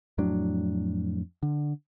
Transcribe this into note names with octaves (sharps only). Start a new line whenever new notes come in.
F2 A2 F#3 D4
D3